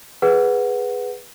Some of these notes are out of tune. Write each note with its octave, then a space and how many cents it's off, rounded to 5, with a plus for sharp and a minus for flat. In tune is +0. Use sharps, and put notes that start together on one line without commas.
G#4 +0 B4 +0 F#5 +0